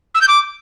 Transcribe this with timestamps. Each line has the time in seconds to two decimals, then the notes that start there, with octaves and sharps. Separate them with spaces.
0.15 E6
0.21 G6
0.28 D6